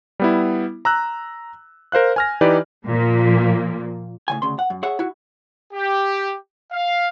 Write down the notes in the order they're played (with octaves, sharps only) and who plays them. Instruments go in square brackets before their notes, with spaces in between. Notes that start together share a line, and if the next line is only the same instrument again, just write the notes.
[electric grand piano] G3 B3 E4
A#5 E6 F#6
A#4 C5 F5 F#6
G#5 F6 A#6
E3 D#4 G4 B4 D5
[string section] A#2 F3 A#3
[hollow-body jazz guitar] A2 C#3 G#5
D2 C#3 C6
F#5
F#2
G#4 C#5 E5 F#5
E4 F#4
[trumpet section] G4
F5